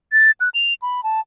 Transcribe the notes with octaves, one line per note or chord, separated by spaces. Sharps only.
A6
F#6
F7
B5
A5